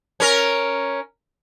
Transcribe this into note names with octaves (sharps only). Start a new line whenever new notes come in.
C#4 A#4